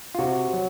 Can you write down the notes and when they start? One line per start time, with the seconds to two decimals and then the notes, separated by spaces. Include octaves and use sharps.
0.15 F4
0.19 C3 F#4
0.53 F#3